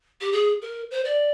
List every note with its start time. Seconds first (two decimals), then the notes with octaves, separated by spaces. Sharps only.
0.21 G4
0.33 G#4
0.62 A#4
0.91 C5
1.05 D5